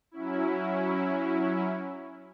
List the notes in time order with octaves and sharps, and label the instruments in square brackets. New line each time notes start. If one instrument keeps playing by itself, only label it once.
[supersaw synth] F#3 C#4 E4